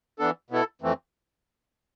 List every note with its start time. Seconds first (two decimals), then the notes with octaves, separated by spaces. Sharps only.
0.19 E3 B3 D4 A4
0.50 B2 B3 E4 A4
0.82 F2 E3 A3 C4